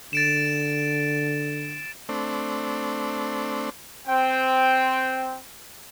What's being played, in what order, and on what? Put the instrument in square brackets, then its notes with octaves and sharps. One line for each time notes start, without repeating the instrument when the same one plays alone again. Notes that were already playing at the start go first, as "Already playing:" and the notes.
[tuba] D3 [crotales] A6 D7 E7
[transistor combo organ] A3 C4 D4
[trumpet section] C4 G5